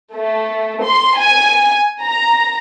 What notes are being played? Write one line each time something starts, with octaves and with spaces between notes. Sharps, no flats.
A3
C6
G#5
A#5